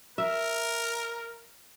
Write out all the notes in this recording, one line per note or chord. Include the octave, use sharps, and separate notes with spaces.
A#4 E5